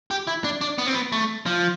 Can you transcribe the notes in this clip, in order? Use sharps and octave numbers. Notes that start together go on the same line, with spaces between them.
G4
E4
D4
D4
B3
C4
B3
A3
F3